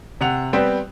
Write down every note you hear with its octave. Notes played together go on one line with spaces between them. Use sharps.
C3 F#5 F7
G3 B3 C4 G5